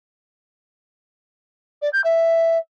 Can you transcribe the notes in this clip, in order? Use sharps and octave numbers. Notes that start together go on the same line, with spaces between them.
D5
G6
E5